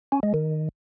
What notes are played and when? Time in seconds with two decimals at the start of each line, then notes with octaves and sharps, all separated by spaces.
0.12 C#4
0.23 G#3
0.34 D#3